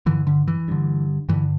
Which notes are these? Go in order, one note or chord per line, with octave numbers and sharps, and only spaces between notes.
G2 D3 E3
D3
E3
G2 D3
G2 D3 E3